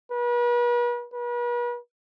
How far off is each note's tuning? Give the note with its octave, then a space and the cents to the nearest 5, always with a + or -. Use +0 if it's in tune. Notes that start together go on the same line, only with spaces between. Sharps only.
B4 -40
B4 -40